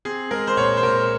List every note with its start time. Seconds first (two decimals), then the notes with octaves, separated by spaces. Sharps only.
0.05 C4 G#4
0.31 G#3 A#4
0.47 C5
0.57 A#2 C#5
0.77 C5
0.83 A#2 A#4